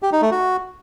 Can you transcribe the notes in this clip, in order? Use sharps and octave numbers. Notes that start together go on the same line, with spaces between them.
G4
D#4
A3
F#4